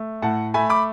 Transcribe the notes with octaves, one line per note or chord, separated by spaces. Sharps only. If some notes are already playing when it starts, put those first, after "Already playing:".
Already playing: A3
A2 F#5 A5
A3 G#5 B5
B5 D6